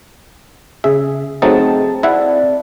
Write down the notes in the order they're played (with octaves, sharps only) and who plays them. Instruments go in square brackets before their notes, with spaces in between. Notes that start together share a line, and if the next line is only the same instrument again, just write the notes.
[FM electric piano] C#3 G#4 [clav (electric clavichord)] E5
[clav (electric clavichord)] F#3 A3 D#4 [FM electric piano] C4 A5 [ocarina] G#4
[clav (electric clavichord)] E4 E5 F#5 [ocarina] D5